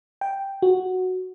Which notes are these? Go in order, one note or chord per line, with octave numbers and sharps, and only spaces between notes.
G5
F#4